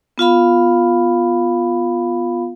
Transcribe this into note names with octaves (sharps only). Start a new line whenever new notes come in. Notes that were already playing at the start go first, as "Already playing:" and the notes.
B3 F4 F5 B5